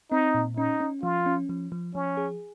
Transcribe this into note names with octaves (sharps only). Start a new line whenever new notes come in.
C4 D#4
A#2
C#4 D#4
C#4
F3 F4
C#4
F3
F3
F3 C#4
G#4